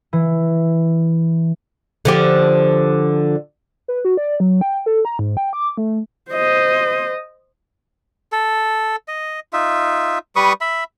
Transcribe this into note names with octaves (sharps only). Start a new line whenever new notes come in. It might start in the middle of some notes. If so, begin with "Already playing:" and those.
E3
D3 F3 G4
B4
F#4
D5
F#3
G5
A4
A#5
G#2
G5
D6
A3
C5 D#5
A4
D#5
D#4 F4 E5
G3 B4 C#6 D#6
E5 B5